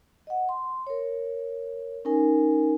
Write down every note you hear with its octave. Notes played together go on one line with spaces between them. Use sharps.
D#5 F#5
C6
A#4 C#5
C#4 D#4 A#4 G#5